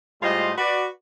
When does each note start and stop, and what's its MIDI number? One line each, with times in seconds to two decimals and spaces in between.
0.21 0.50 45
0.21 0.50 55
0.21 0.50 56
0.21 0.50 65
0.21 0.50 72
0.21 0.50 75
0.56 0.84 66
0.56 0.84 71
0.56 0.84 74